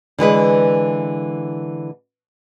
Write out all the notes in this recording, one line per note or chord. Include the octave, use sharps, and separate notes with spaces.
D3 E3 G#3 B4